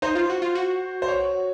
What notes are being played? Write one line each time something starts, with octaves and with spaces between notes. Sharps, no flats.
D#4 C5
F4
F#4
F4
F#4
C5
C#5